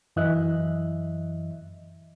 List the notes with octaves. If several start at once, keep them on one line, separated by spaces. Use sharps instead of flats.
F#2 E3 D#5 E5 F#6